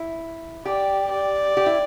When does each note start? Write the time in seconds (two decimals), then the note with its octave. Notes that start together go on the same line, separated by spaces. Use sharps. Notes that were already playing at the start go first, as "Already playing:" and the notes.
Already playing: E4
0.65 G4 D5
1.11 D5
1.57 G4
1.66 E4